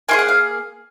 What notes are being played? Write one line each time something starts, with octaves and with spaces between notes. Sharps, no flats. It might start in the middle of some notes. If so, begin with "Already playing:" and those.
A#3 F4 G#4 G#5
F#5
F5